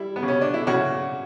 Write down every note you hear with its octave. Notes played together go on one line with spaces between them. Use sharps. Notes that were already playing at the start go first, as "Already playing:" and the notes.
Already playing: G3 E4
B3
C#3
C#4
D4
E4
C#3 F#4